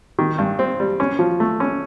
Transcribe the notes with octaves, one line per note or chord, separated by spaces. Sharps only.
D#3
G2
C4
G3
C#4
F3
A3
C#4